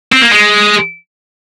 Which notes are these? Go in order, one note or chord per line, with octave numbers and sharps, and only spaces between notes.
C4
A#3
G#3